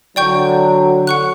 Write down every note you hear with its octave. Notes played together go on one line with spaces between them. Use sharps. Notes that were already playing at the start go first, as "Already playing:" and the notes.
D3 F#3 D5 G5 C#6 G6
F#5 C#6 F#6